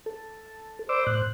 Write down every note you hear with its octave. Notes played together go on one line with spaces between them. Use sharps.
A4
C5 D5 D6 E6
A2 F#6